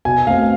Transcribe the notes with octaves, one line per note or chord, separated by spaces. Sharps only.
B2 G#5
A3 C4 F5